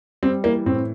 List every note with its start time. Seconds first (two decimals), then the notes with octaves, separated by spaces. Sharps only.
0.23 G3 C4
0.44 E3 A#3
0.66 A2 C4